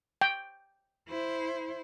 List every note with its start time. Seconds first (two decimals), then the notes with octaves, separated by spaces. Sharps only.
0.21 G5
1.08 E4 C5